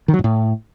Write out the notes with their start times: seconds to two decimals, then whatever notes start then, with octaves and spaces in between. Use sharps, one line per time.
0.08 D#3
0.14 F#3
0.19 G#2
0.24 A2